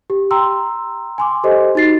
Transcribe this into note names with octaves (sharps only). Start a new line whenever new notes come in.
G4
G5 A#5 C6 E6
G#5 C6 D6
G4 A4 C5 D#5
D#4 F#4 A6 C7